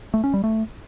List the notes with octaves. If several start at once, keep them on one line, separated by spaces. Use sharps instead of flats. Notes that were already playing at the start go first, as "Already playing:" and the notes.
A3
C#4
G3
A3